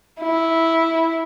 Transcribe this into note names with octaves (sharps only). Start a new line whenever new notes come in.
E4